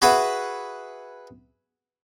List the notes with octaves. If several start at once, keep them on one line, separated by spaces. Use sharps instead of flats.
F#4 G#4 B4 E5 F#5